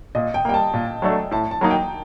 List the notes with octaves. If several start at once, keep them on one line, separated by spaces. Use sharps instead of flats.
A#2 D#5
G5
G3 A#3 G5
A5
A#2
F#3 A3 D4 A4
A2 A5
A5
F#3 A#3 D#4
G5